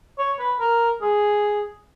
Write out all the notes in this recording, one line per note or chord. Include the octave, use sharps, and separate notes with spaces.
C#5
B4
A#4
G#4